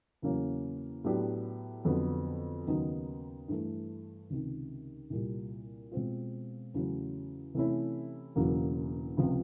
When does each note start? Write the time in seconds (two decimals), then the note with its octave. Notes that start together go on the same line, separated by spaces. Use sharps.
0.22 E2 C#3 F#3 A#3 C#4
1.04 A2 F#3 B3 D4 G4
1.85 F2 D3 F#3 B3
2.67 D#2 C#3 F#3 B3 D#4
3.48 G2 E3 A3
4.30 C#2 C3 D#3
5.10 C2 A#2 G3
5.92 B2 G#3 C4 F4
6.74 E2 C#3 F#3 A3 C#4
7.54 C3 E3 A3 C#4 E4
8.36 E1 E2 C#3 F#3 A#3
9.17 C#2 C3 F3